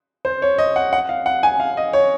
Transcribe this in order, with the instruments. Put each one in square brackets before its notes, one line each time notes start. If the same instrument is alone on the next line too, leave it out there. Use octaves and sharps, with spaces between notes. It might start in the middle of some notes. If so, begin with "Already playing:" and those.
[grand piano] C5
C#5
D#5
F#5
F#5
F5
F#5
G#5
F5
D#5
C#5